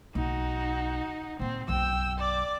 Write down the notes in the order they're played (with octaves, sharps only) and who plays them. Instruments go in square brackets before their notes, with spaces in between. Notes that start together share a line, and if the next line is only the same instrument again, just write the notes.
[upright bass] B1 [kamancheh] D#4 F#4
[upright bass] A#2 G3 [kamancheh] C4
[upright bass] B1 F#2 [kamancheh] G5 E6
[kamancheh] D5 D6